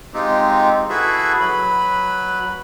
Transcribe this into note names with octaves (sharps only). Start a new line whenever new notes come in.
G#3 C4 D#4 F4 G4
E4 F#4 G#4 A4 B4 E5
F#3 B4 B5